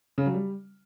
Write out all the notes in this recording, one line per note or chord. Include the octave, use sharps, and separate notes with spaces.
C#3
F#3
G3